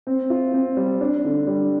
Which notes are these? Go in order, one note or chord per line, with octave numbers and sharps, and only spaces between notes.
C4
F4
C4
G3
D4
D3
G3